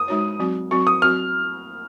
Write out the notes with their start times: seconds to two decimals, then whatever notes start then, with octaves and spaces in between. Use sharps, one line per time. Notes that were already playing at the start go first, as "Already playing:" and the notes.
Already playing: D#6
0.08 G#3 D#4 F#4 C#5
0.39 F#3 C4 F#4
0.71 F#3 C4 F#4 C#6
0.87 D#6
1.02 F#3 C4 F#4 F6